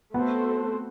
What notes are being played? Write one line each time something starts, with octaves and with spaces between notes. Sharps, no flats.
A3 B3 C4 F#4 A4 C5